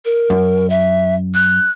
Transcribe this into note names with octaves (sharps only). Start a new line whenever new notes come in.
A#4
F#2
E5
F#6